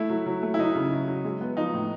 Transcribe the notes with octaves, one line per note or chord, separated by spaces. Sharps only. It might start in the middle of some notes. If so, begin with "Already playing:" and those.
Already playing: A3 E4
F#3
F#3
A3
E4
F#3 D#4
C#3
F#3
F#3
G#3
B3
F3 D#4
A2